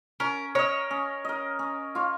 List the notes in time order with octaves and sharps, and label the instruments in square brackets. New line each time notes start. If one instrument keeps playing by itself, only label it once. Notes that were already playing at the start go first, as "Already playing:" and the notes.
[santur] C#4 [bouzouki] A#4
[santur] A#4 D#5 [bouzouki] C#5
[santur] C#4
A#4 D#5
C#4
F4 C#5